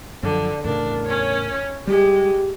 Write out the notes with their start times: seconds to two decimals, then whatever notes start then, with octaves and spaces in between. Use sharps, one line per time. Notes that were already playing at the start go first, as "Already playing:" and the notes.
0.23 F#2 D3 F3 D5
0.64 E2 A2 C#3 D4 A#4
1.05 C#4 C#5
1.87 G3 G#3 G4